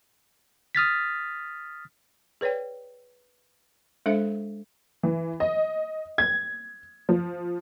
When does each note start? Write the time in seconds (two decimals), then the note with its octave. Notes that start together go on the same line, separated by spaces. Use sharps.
0.75 D#6 F6 A6 B6
2.41 G#4 B4 C#5 D5 G5
4.06 G#3 D4 A4 C5 E5
5.03 E3
5.40 D#5
6.18 G#6
7.09 F3